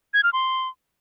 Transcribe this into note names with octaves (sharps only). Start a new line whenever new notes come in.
G#6
F6
C6